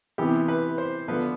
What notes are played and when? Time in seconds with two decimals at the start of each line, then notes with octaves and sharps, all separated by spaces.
0.18 C3 E3 B3 G4
0.48 B4
0.78 C5
1.08 D3 F3 B3 B4